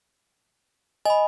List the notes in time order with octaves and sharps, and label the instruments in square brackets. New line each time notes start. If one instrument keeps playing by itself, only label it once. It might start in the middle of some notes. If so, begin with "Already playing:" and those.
[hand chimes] D#5 [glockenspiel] G#5 B5